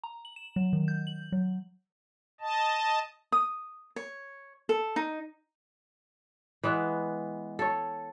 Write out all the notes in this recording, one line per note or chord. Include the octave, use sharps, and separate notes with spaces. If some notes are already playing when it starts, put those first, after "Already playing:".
A#5
F#7
E7
F#3
D#3
G6
F#7
F#3
D#5 A5
D#6
C#5
A4
D#4
E3 G#3 B3
A4 C#5